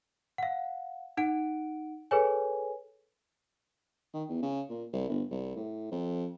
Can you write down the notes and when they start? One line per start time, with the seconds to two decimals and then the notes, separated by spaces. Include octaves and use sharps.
0.38 F5 F#5
1.17 D#4 F#5 D7
2.11 G#4 A4 B4 C#5 G#5
4.14 D#3
4.29 E2
4.42 C#3
4.69 A#2
4.93 C2
5.09 G1
5.31 C2
5.56 A2
5.92 F2